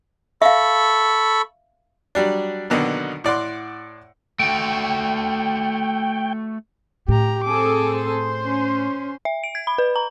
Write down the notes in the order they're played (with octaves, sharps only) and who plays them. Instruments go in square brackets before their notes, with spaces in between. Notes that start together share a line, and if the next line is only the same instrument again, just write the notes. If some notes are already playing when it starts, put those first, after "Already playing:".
[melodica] A4 B5 C#6 [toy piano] E5 F5
[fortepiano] F#3 G3 D4
B2 D3 D#3 F#3 A#3 B3
A2 D5 F#5 C6
[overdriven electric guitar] A3 F#4 [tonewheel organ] G5
[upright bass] A2 [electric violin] G4 A#5
[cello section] C4 G#4 A4 [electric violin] D6
[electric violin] C5 C6
[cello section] C#4
[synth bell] E5
D7
G#6
B5
B4
A#5